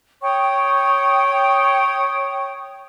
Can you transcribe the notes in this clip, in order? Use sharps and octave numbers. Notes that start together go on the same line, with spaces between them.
C#5 G5 C#6 D#6